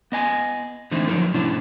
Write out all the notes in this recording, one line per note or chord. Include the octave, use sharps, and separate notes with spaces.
B3 D#5 G#5
D3 E3 A3 C4 D#4 E4
F3 F#3 D#4 A4 A#4
A2 C3 C#4 D4 E4